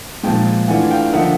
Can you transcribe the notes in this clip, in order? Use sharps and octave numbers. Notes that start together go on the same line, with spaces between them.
A#2 F3 G#3 G5 A5
E3 A3 D4 F4 F#5 G#5
F5 G5
D3 F3 A#3 D#4 E5 F#5